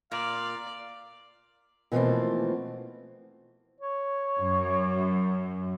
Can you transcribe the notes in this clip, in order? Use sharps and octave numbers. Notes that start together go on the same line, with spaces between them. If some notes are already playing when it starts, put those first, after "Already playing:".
A#2 D5 F5
B2 E3 F3 A3 A#3 C4
C#5
F#2